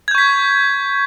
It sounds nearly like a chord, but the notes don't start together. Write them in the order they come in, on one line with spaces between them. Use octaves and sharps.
G#6 G6 C#6 B6